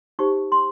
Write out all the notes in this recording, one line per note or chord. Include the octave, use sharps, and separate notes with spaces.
D#4 G4 C5 C#6
C6